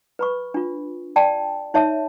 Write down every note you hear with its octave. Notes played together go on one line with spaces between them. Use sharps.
B4 B5 C#6
D4 F4
D5 G5 A5
D#4 C#5 E5 A5